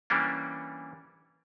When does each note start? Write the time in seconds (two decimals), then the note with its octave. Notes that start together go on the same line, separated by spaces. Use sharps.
0.10 E3 G3 A#3 C#4 D4